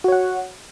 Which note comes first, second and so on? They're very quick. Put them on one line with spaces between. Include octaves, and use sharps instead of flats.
F#4 C#5 F#5